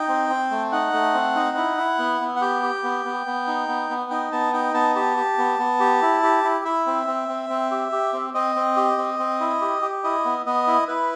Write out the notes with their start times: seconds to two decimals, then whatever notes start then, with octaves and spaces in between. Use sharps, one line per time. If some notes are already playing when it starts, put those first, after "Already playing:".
Already playing: D#4 G5
0.08 C4
0.30 C4
0.51 A3
0.72 D#4 F#5
0.93 A3
1.14 C4
1.35 D#4
1.57 E4
1.78 E4
1.99 B3
2.21 B3
2.36 F#5
2.41 G4 G5
2.63 G4
2.83 B3
3.05 B3
3.26 B3
3.47 D#4
3.68 B3
3.90 B3
4.10 D#4 G5
4.32 B3 A5
4.53 D#4 G5
4.74 B3 A5
4.95 G4 A5
5.17 G4
5.38 B3
5.59 B3
5.80 G4
6.02 E4
6.23 G4
6.44 E4
6.65 E4 E5
6.86 C4
7.07 C4
7.28 C4
7.50 C4
7.71 G4
7.92 G4
8.13 C4
8.34 C4 D#5
8.56 C4
8.77 G4
8.98 C4
9.19 C4
9.40 E4
9.61 G4
9.82 G4
10.04 E4 D#5
10.25 B3
10.46 B3 D#5
10.67 E4
10.88 E4 B4